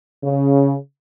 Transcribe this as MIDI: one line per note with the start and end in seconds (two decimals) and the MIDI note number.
0.24 0.76 49